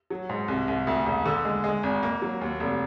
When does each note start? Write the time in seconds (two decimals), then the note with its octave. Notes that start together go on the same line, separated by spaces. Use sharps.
0.10 F#3
0.29 G#2
0.48 C2
0.68 C2
0.87 D2
1.06 E1
1.26 D3
1.45 G#3
1.64 G#3
1.83 G#1
2.03 A#3
2.22 F#3
2.41 D#2
2.60 F1